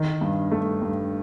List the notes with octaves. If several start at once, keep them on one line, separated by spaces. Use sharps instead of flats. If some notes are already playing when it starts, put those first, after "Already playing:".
Already playing: D#3
G2
A3
G2